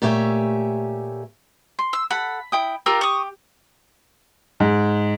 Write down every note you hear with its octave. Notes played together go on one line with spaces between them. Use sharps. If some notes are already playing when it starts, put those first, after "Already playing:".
A#2 A3 G4 C#5 E5 G#5
C6
E6
A4 F#5 B5
E4 G5 D#6
F4 G4 A#4 E6
C#6 D#6
G#2